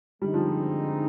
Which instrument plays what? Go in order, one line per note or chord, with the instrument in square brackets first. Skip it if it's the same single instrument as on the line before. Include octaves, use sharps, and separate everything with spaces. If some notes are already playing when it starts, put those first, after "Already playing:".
[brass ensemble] D3 G#3 C4 D#4 [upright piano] G3
[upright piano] F3